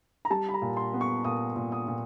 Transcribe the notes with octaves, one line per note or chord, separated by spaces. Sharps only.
A#5
G3 A5
B5
A#5
A#2
C6
B3
C#6
A#2 D#6
A#2
D#6
A#2